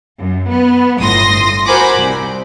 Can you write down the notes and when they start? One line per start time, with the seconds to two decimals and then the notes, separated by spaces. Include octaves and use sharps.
0.19 F#2
0.51 B3
0.99 G1 A2 C6 D#6 A#6
1.66 F#4 A#4 C5 G#5 B5 D6
1.96 C2